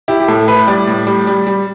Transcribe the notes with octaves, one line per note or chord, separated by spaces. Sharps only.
E4 G4
G4
A2 A4
E4 B4
G3 D5
A2
G3
G3
G3